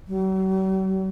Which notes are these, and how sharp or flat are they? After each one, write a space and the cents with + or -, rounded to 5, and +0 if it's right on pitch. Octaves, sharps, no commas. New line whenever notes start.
F#3 +45